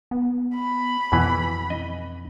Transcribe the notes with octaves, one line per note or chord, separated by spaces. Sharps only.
B3
B5
F2 B2 E3
D#5